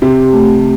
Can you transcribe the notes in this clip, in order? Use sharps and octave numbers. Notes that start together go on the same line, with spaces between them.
C3 G4
A3